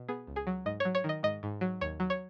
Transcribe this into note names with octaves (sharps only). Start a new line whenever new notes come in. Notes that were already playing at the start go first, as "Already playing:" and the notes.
Already playing: B2
B3 G#4
C#2
G#4
F#3
G#2 D#5
F#3 C#5
C#5
D#3 D#5
G#2 D#5
G#2
F#3
D#2 C#5
F#3
C#5